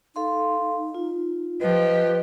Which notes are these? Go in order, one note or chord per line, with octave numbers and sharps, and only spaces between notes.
D#4 A4 F5 C6
F4
F3 G4 B4 D#5